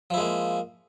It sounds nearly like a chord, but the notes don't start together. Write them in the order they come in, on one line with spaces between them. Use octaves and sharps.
F3 E4 G#3 A#3